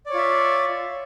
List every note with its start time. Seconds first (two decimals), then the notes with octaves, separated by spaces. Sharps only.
0.06 D5
0.10 C#5
0.14 F4
0.17 E5